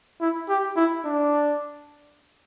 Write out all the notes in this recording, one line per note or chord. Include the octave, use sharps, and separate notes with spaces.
E4
G4
E4
D4